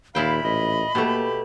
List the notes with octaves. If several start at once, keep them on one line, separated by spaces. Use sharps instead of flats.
D#2 A#2 E4 F5 G5 B5
A1 D#5
B2 A3 A#3 G4